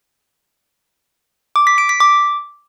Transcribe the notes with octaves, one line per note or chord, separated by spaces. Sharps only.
D6
B6
D7
B6
D6